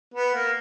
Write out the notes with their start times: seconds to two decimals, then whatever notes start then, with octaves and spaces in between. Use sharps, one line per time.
0.14 B3
0.34 A#3